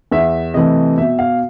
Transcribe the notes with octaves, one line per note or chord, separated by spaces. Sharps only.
E2 E5
C3 E3 A3 D#5
B2 E5
F5